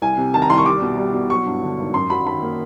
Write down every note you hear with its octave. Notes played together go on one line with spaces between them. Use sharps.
C2 G#5
C3
D#3 A5
A#5
C2 C6
C#6
G3 D6
B2
G3
B2
F#3 C#6
G2
D3
G#1
F#2 C6
F#3 B5
D#3 B5
A#3